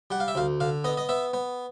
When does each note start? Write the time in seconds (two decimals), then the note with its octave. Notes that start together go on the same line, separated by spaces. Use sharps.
0.11 G3 F#5
0.20 F5
0.28 E5
0.35 D2 F5
0.60 D3 F5
0.84 B3 D#5
0.97 D#5
1.09 B3 E5
1.34 B3